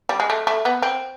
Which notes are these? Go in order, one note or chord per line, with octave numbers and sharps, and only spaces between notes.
G3
G#3
A3
A3
B3
C4